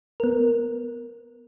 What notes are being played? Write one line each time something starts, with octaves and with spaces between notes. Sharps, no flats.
B3 A#4